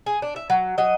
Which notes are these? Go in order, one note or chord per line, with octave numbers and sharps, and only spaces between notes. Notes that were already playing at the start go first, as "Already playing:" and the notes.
G#4
D4
E5
F#3
F#3 D#5